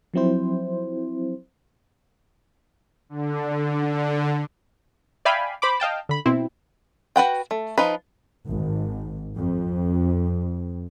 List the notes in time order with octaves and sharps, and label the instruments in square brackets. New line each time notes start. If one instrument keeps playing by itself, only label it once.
[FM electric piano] F3 F#3 C4 E4 C5
[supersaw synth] D3
D3
[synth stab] D5 E5 F5 G5 G#5 B5
C5 B5 D6
D#5 F5 G5 A5
D3 B5
B2 C4 E4
[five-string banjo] F#4 B4 F#5 G5
A3
F3 D#4 B4
[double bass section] G#1
F2